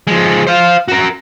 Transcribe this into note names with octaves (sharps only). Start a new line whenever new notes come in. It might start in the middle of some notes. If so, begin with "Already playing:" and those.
F3 G#3
C5 F5
F#4 A#4